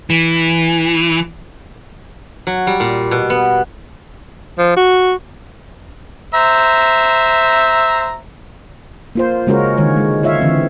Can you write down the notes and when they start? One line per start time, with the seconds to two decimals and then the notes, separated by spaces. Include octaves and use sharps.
0.10 E3
2.47 F#3
2.67 G3
2.80 A#2
3.11 B2
3.30 B3
4.58 F3
4.77 F#4
6.34 C5 E5 A#5
9.15 A#3 F4 C5
9.47 C#3 G#3 C#4 F4 F#4 A#4
9.78 D3 D#3 G#3 C#5
9.97 G#3
10.23 F4 C#5 E5 F5
10.41 D3 E3 C4